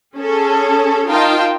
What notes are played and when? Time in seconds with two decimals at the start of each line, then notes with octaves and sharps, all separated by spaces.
0.17 C#4 G#4 A4
1.09 D#4 F4 A#4 F5 G5 A5